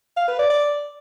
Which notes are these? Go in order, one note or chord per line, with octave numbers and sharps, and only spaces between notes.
F5
B4
D5
D5